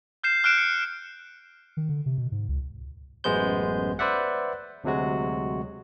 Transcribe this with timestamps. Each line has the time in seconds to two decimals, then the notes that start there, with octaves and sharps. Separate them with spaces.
0.23 F6 G6 C7 E7
0.44 F6 F#6 D7 E7
0.58 C#7
1.77 D#3
1.89 D3
2.06 C3
2.18 B2
2.32 G#2
2.49 C#2
3.24 A1 F#2 G#3 B3 C5 G6
3.99 B4 C5 D5 E5 F#5
4.84 D2 C3 F#3 G#3 F#4